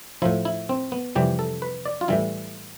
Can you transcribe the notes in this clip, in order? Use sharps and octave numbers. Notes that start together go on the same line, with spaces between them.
A2 F3 E4
E4
C4
B3
F2 C3 E3 G3 G4
A4
B4
D5
F4
A2 E3 G3 E4